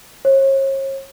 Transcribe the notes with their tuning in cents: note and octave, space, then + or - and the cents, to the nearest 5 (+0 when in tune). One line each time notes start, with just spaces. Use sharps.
C#5 -40